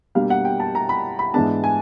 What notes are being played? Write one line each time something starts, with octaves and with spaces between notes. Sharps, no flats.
B2 G3 A#3 D4 F5
F#5
G5
A5
A#5
B5
B5
G#2 E3 G#3 B3 D4 A5
G#5